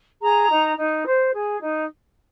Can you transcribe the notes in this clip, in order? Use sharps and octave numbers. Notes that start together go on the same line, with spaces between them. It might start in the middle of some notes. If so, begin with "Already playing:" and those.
G#4 A#5
D#4
D#4
C5
G#4
D#4